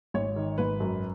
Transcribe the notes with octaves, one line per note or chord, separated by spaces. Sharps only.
G#1 C#5
D#3
G#1 B4
F#2